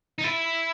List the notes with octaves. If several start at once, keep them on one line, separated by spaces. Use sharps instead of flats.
D#4
E4